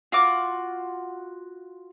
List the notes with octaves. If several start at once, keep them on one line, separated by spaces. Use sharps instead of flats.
F4 F#4 D6